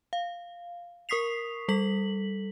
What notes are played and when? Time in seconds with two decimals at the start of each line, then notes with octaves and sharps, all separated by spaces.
0.13 F5
1.09 A#4 C#6 D#6 B6 C7 F7
1.68 G3 A4 B6 F#7